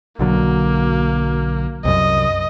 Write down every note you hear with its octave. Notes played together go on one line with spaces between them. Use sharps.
B1 D3 F#3 A#3
C2 F#2 D#5